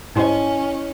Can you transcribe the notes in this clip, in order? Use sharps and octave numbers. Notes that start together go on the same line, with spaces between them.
G#2 G3 C#4 E4 C5 D#5 G#5